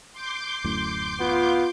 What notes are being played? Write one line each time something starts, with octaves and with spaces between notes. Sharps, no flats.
C6 D6 G6
D1 F#2 A2
B3 F4